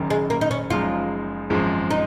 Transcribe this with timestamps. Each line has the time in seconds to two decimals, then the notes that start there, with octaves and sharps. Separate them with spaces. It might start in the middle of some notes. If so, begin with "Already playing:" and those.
Already playing: F#1 F#2 D#3
0.10 G#3
0.30 A#3
0.41 D#4
0.51 C#4
0.70 F#1 F#2 F3 G#3 D#4 F4
1.50 G#1 F#2 F3 G#3
1.91 D#4